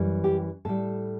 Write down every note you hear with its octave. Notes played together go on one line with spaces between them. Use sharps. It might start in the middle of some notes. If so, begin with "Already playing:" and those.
Already playing: F#2 E3 G3
G4
A2 G3 A4